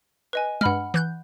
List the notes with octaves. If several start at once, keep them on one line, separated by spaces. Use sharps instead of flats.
B4 D#5 G#5
G2 G#3 F#5 B5 F6
E3 F#6 G6